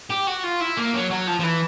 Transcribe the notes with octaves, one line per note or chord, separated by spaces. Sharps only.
G4
F#4
F4
E4
A#3
F#3
F#3
F3
F3
E3